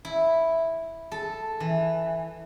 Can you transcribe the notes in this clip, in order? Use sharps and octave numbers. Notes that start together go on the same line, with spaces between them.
E4
A4
E3